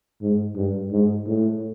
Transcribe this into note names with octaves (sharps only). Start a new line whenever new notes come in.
G#2
G2
G#2
A2